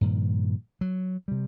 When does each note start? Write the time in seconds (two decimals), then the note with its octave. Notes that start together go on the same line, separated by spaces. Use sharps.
0.01 G2 A#2 D#3 F3
0.81 F#3
1.28 C3 G3